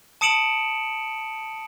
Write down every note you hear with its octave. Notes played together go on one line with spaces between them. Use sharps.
A5 D#6 C#7 D7 E7 F#7